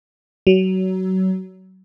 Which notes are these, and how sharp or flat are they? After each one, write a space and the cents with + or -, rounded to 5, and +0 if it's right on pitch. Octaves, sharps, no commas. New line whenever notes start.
F#3 +25